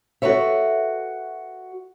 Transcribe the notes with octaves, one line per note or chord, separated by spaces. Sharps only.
F#4 A4 B4 C#5 E5